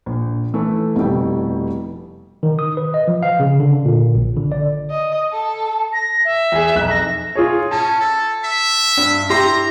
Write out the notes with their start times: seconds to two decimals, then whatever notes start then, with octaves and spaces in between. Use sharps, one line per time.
0.06 A#1
0.54 E3 A3 E4
0.96 F1 B2 G3 E4 G5
2.43 D#3
2.59 D#6
2.77 B4
2.94 D#5
3.08 F3
3.23 F5
3.40 C#3
3.60 D3
3.85 A#2
4.15 A#1
4.37 D3
4.52 D5
4.90 D#5
5.32 A4
5.93 A#6
6.25 E5
6.52 E2 G#4
6.75 B1 F2 F#6
6.90 A#6
7.35 F4 G#4 C#5
7.71 C#4 A5
8.01 A4
8.44 E5
8.97 G2
9.30 E4 G4 A#5 C6